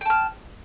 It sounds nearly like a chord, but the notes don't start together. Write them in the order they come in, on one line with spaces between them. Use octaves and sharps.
G5 A5 F6